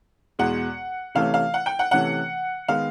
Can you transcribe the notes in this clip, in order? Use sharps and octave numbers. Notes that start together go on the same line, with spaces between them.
E2 B2 G#3 F#5
C3 E3 A3 C#4 F5
F5
F#5
G5
F#5
C3 E3 A3 C#4 F#5
D#3 G#3 B3 F5